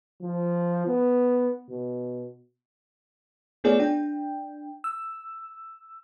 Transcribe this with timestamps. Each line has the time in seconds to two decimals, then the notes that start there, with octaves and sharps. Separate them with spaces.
0.22 F3
0.87 B3
1.69 B2
3.64 A3 B3 F4 G#4 C#5 D5
3.79 D4 G5
4.84 E6